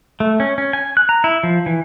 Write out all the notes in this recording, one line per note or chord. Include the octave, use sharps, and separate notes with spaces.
A3
C#4
C#4
G#5
F#6
A#5
E4
F3
E3